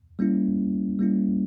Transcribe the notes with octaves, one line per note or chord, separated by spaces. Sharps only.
G3 A#3 C#4 E4
G3 A#3 C#4 E4